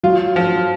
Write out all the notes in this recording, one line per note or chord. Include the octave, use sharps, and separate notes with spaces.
F#3 F4
F3